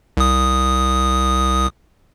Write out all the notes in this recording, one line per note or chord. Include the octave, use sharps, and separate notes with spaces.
C2 D#6